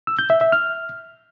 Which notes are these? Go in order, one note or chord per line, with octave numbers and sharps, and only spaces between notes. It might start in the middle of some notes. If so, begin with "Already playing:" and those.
E6
G6
E5
E5
F6